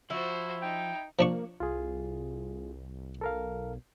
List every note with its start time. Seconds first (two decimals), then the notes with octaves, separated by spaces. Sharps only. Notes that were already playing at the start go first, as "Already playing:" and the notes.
0.10 F3 E4 F#4 C5
0.62 D#4 G5
1.19 F3 A#3 D4 C#6
1.60 C2 F4 G#4
3.21 B1 A4 A#4 F5